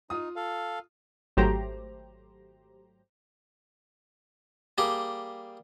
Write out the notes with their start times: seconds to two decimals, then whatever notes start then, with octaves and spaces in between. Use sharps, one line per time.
0.10 D#4 F4 D#6
0.36 A4 F5
1.37 G#1 F#3 A3 G4 C5 A#5
4.78 G3 A#3 G4 G#4 G5